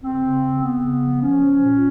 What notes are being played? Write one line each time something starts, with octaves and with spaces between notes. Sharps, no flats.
C#3 C4
C#3
C#3
C#3 B3
C#3
F3
F3 C#4
F3
A#2